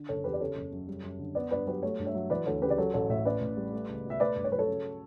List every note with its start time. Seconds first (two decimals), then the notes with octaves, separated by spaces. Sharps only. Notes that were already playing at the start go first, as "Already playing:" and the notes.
Already playing: D3
0.09 F#1 A4 C#5
0.24 E2 G4 B4
0.33 D5
0.41 C#3 A4 C#5
0.56 F#1
0.72 F#2
0.88 G3
1.03 F#2
1.19 D3
1.35 B3 B4 D5
1.51 G2 B4 D5
1.67 F#3 G4 B4
1.82 A3 A4 C#5
1.99 G2
2.06 C#5 E5
2.15 F#3
2.30 E3 B4 D5
2.46 D2 A4 C#5
2.62 C#3 G4 B4
2.70 D5
2.78 F#3 A4 C#5
2.94 A1 A4 C#5
3.09 A2 C#5 E5
3.25 C#4 B4 D5
3.41 A2
3.57 G3
3.72 A3
3.89 C#2
4.04 B2
4.10 E5
4.20 A3 B4 D5
4.36 G2
4.44 C#5
4.52 F#3 B4
4.59 A4 C#5
4.67 C#3